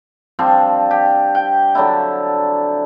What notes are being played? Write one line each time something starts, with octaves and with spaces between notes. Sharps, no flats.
F3 G3 C4 D4
G4
G5
D3 F#3 D4 E4